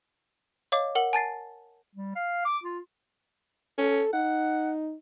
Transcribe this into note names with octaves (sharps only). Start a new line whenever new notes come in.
C#5 D#5 F5 D6
A#4 F#5 F#7
G#5 A5 A6 C7
G3
F5
D6
F4
C#4 A4
D#4 F#5